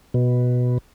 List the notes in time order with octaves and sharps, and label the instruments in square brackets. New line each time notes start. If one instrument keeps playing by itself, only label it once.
[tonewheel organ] B2